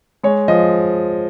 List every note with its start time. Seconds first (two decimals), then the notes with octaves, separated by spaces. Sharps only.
0.23 G#3 C#5
0.48 F3 D#5